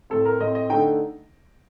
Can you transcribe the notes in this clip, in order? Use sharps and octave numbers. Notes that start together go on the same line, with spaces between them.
A2 A3 C4 A4
A#4
A2 A3 C4 D#5
D#5
D3 A3 D#4 G5